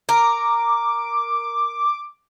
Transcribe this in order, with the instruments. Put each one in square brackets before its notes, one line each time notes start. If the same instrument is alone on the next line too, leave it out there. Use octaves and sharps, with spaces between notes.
[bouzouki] A#4 [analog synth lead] D6